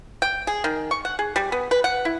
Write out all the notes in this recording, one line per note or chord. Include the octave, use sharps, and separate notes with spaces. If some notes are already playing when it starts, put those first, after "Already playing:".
G5
G#4
D#3
C#6
F#5
G#4
G3
B3
B4
F#5
E4